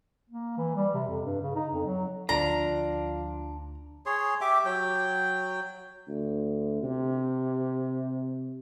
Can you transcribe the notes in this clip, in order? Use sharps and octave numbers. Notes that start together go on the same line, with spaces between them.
A#3
E3
G3
C3
F2
G2
C#3
D#4
F2
F#3
D2 F3 D4 F4 F5 A#5
G#4 C#5 C6
G4 E5 D6
F#3 G5
D2
C3